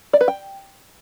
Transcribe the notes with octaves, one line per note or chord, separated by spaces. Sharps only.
D5
B4
G5